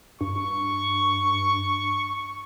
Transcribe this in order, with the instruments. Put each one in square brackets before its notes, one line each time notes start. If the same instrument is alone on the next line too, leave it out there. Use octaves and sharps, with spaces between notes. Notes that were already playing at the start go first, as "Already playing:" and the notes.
[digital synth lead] G2 [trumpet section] C#6